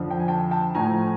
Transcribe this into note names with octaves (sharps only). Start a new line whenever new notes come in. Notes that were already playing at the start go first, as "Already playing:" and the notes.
Already playing: F2 D3 F3
G5
G#5
G5 A5
G5 A5
A2 F3 A3 G#5 A#5